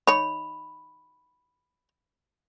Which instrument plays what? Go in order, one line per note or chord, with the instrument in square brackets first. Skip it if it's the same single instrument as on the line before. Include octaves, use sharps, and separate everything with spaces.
[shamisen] D#4 C#5 [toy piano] B5